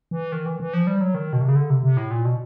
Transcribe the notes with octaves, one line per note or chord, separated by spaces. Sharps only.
E3
D#3
E3
E3
F3
G3
F#3
D#3
B2
C3
C#3
D3
C3
C3
A2
A#2
B2